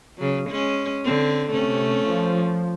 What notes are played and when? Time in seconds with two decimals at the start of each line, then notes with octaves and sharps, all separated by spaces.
0.18 C#3 F#3
0.49 G#3 C#4
1.05 D3 C4
1.51 C3 A3 C#4
2.06 F3